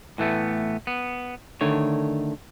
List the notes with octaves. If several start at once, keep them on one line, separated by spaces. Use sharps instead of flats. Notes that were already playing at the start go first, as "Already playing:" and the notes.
A2 E3 A3 B3
B3
D3 D#3 A3 C#5